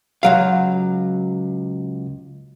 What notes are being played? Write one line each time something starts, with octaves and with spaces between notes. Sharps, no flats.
C#2 F#3 F5